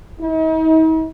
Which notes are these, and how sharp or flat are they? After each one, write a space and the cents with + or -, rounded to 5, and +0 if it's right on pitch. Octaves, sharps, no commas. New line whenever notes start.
D#4 +45